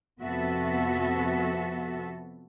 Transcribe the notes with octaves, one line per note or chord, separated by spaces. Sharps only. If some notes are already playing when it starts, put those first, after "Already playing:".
F2 C3 B3 F#4 A4 E5